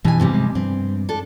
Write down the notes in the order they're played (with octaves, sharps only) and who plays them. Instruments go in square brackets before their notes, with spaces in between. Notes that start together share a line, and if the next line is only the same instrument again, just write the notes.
[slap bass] G2 E3 [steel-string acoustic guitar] B2 G#5
[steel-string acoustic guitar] G#2 C3 G3
[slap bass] G#3
[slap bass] G2 [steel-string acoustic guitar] C4
[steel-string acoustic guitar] D4 A4